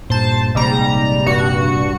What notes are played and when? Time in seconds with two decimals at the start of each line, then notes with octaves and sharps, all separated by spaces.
0.10 G2 A#2 C5 A5
0.55 A#1 G#2 C3 G3 A#3 A#5
1.26 G2 F#4 C#7